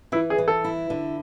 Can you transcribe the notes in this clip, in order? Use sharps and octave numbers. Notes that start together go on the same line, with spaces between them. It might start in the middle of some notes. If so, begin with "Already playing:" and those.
E3 E4
G#4
E3
A4
E4
D3